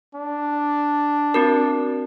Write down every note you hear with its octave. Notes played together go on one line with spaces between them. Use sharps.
D4
C4 F#4 A#4